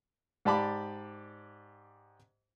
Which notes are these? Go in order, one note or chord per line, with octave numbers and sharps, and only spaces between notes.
G#2 G4 D5 A5 B5 D6